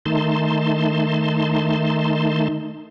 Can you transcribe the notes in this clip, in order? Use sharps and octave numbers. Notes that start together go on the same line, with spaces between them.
D#3 A3 D#4 A5 C6